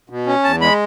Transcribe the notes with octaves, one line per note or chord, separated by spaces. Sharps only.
B2
C#4
E2 A5
G#3 B5